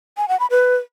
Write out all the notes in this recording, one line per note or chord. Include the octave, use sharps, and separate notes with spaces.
G#5
F#5
B5
B4